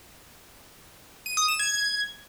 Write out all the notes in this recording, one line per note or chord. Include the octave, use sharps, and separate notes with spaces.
D#7
D#6
E7
G#6